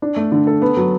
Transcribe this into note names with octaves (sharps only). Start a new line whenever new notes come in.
D4
A3
D3
A4
B3
F#3